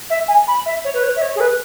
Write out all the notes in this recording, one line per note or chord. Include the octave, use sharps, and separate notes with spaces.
E5
G#5
B5
E5
C#5
B4
C#5
E5
C#5
G#4
B4